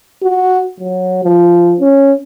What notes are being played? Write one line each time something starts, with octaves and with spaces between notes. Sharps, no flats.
F#4
F#3
F3
C#4